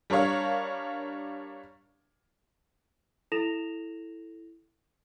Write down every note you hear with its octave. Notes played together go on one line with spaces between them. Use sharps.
G3 D4 A#4 C#5 F5
E4 A4 A#6 E7 F7